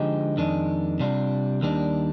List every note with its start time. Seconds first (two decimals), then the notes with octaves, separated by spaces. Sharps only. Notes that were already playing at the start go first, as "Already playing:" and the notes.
Already playing: D3 F3 G#3 D#4 G4
0.37 F2 D#3 G#3 D4
1.00 C3 G3 D4 F4
1.61 D#2 D#3 G3 D4